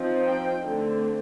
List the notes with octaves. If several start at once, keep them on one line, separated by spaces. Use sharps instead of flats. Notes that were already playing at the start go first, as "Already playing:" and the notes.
Already playing: F3 C4 D#4
G5
D3 A3 C4